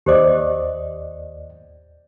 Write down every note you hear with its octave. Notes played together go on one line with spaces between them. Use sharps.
D#2 G4 C5 D5 D#5 D6